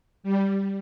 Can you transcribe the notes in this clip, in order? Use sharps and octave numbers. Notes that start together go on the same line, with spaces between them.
G3